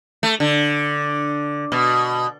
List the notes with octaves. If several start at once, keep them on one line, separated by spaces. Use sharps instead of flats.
A3
D3
B2